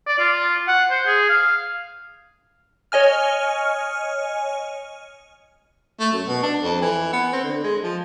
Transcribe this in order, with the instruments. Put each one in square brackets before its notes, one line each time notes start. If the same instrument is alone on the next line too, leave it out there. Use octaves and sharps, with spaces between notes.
[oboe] D5
F4
F#5
C5
G#4
F5
[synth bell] C#5 D#5 G#5 F6
[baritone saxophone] A3
F#2
B2
D4
F2
E3
B3
C4
D3
G#3
F3